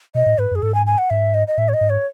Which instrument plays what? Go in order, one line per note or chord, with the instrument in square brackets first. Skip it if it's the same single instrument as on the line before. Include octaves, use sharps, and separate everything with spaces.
[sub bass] B2 [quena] D#5
[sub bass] A2
[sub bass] G#2 [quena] B4
[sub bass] F#2
[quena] G#4
[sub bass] G#2 [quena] A4
[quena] G#5
G#5
F#5
[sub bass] G#2 [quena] E5
[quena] D#5
D#5
[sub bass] A2 [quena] E5
[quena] C#5
D#5
[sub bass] G#2
[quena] C#5